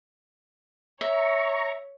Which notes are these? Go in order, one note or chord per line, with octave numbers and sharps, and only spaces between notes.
C#5 E5 A#5 C#6